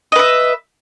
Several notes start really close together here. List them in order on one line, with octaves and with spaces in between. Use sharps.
D#5 B4 E5